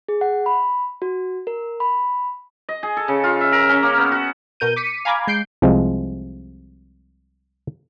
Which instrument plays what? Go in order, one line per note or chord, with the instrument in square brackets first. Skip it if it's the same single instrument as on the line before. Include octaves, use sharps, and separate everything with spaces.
[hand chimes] G#4
F#5
B5
F#4
A#4
B5
[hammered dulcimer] D#5
G#4
A4
C#3
F4
E5
A#4
C#4
A#3
B3
F#4
[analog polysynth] B2 A#4 G6 D#7
D6 B6 C#7 D#7
F5 G#5 A#5 B5 D6 G#6
G#3 G6 C7 D7
[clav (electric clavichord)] C2 C3 F3 G#3